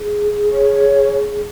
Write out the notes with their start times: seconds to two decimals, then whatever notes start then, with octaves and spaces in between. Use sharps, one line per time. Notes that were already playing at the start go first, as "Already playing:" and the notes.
Already playing: G#4
0.51 C#5